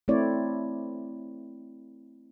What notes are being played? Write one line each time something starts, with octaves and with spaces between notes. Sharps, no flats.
A3 C4 E4 C#5 D5